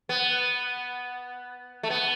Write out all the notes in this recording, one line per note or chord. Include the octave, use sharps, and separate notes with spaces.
B3
A3
B3